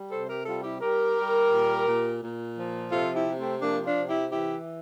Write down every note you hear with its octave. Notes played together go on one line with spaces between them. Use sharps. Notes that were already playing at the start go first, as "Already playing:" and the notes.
Already playing: G3
C3 A4 C5
G4 A#4
G3 F4 A4
E4 G4
G3 G4 A#4
G3
A#2
A#2
A#2
F3
C3 F4 A4
E4 G4
C3
A3 C4
F3 A#3 D4
D4 F4
C3
E4 G4
E3 E4 G4